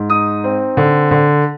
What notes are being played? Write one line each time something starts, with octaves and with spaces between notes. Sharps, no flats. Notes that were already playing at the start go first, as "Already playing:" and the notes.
Already playing: G#2
D#4 D#6
C4
D3
D3